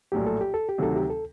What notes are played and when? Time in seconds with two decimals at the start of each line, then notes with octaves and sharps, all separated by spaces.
0.12 A#1 A2 F#3 G4
0.27 A4
0.41 G4
0.54 A4
0.69 G4
0.78 D2 C3 D#3 F#3 A4
0.96 G4
1.10 A4